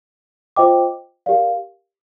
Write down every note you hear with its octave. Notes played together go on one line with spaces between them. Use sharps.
F4 C5 D#5 G5 D6
G4 A#4 D5 F5